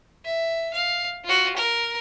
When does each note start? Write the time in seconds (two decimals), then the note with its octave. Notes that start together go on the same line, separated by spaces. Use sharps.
0.25 E5
0.74 F5
1.25 F4 F#4
1.57 A#4